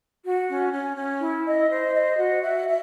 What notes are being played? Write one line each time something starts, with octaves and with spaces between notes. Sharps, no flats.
F#4
C#4
C#4
C#4
E4
D#5
C5
D#5
F#4
E5
E5